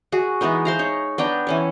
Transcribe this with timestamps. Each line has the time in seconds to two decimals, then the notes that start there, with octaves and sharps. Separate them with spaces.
0.12 F#4 G#4
0.41 E3 G#3 B3 D#4
0.65 C5 F5 A#5
0.79 D#4 C#5
1.18 B3 D4 G5 A#5
1.47 E3 C#4 C#5